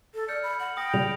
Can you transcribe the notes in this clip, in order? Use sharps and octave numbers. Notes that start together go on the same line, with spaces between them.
A4
D5 F6 G6 C#7
B5
F#5 F#7
G5 B5 D#6 A#6
A#2 C#3 G3 F7